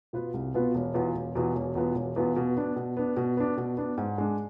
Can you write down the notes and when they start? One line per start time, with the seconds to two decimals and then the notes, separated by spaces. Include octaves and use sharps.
0.13 B2 B3 F4 B4
0.34 C2
0.55 B2 B3 F4 B4
0.75 E1
0.94 E2 B2 B3 F4
1.15 E1
1.35 E2 B2 B3 F4
1.55 E1
1.75 E2 B2 B3 F4
1.95 E1
2.16 E2 B2 B3 F4
2.36 B2
2.57 B3 D4
2.76 B2
2.97 B3 D4
3.17 B2
3.37 B3 D4
3.57 B2
3.77 B3 D4
3.98 G#2
4.18 G#3 D4